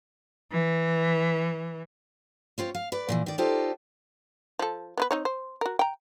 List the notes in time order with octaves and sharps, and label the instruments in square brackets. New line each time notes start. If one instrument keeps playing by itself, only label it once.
[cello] E3
[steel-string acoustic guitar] C4 F4 C#5
F5
B4 D5
A#2 D#3 E3
D#3 D5
D#4 F4 G4 A4 C5 D5
[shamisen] F3 A4
B3 F4 B4
C4 D#4 C#5
C5
F#4 A#4
G5 A#5